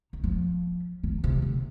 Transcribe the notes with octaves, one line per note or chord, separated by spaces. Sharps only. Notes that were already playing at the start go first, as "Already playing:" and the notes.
D#3
F3
D#3
C3
D3